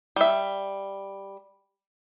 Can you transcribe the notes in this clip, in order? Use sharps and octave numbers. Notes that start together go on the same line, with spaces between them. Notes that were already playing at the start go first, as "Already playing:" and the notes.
G3 E5